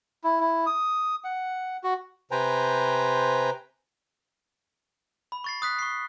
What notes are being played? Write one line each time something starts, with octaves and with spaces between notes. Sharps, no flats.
E4
E4
D#6
F#5
F#4
C3 B4 C5 G5 G#5 A#5
B5
C#6 A6 C7
D#6 F#6 B6
C#6 C7